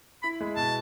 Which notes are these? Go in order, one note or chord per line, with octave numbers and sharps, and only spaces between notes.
E4 B5
G#3
B2 A5